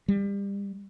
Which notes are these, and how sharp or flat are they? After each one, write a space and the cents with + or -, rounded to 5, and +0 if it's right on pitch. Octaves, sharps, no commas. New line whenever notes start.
G3 +30